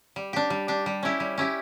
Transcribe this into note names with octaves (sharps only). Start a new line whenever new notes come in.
G3
D4 G4
G3
D4 G4
G3
C#4 E4 G4
G3
C#4 E4 G4